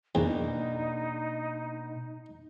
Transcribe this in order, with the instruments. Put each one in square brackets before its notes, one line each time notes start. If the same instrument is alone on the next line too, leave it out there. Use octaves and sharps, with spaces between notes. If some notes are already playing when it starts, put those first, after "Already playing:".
[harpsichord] E2 [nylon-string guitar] B2 A#3 D4 [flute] D#4